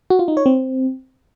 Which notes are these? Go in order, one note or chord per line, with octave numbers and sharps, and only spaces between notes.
F#4
F4
D#4
C#5
C4